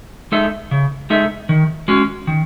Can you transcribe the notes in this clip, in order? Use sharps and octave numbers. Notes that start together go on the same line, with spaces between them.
G#3 D#4 A4 E5
C#3
G#3 D#4 A4 E5
D#3
G#3 C#4 F#4
D#3